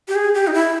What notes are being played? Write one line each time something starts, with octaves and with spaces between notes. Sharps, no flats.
G4
G#4
G4
D#4
E4